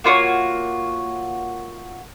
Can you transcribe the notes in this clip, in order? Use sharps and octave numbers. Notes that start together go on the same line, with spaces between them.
A#3 F4 F#4 C#5